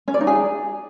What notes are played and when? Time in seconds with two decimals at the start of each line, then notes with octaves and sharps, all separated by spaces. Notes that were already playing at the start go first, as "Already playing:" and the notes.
0.08 C#4
0.14 D5
0.21 D#4
0.27 G#4